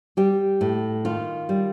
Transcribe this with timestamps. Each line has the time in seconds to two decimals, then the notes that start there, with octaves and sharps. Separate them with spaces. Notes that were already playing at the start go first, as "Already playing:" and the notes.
0.17 G3 G4
0.61 A2
1.05 D#3 F4
1.49 G3